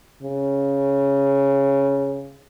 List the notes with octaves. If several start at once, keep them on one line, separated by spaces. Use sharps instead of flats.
C#3